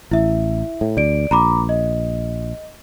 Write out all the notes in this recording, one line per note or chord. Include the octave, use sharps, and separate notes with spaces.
A1 E4 E5
A2
D2 D5 D7
A#1 A#5 B5 D6
D#5